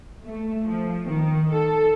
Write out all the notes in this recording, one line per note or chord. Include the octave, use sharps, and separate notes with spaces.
A3
F3
D#3
A4